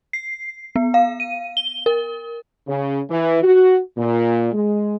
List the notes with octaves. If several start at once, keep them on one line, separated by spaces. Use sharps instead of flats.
C7
B3
F5
D#7
G7
A#4
C#3
E3
F#4
A#2
G#3